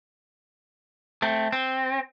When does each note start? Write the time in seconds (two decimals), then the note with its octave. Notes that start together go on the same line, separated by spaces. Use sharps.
1.22 A3 C4
1.53 C4